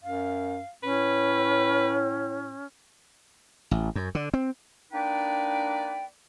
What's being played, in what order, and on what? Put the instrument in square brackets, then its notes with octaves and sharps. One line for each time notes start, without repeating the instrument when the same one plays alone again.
[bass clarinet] F#2 [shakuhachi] F5
[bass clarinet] A2 [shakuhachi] C#4 [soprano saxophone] B4
[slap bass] A1
F#2
D3
C4
[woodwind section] A#3 D4 D#4 B4 D5 G5